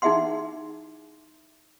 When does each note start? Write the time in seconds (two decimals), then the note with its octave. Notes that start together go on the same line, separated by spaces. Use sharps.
0.02 D#4 E4 G#4 E5 F#5 C6